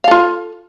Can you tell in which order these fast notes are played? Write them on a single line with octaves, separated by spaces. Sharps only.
F5 A4 F4